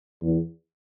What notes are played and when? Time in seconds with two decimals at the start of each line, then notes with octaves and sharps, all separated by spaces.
0.22 E2